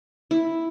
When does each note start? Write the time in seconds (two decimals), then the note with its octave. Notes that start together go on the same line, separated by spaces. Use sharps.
0.31 E4